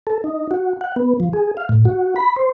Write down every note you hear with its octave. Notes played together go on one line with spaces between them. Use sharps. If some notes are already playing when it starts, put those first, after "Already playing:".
A4
D#4
F#4
F#5
B3
F3
G#4
F5
A2
F#4
B5
C5